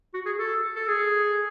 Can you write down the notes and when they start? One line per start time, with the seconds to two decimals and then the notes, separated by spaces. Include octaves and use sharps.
0.14 F#4
0.26 G#4
0.39 A4
0.76 A4
0.88 G#4